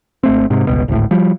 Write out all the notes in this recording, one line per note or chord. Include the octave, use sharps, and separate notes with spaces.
G#1 A3 C4
G#2 C3
G1 C#2 B2
G#1 D2 A2
F3 G3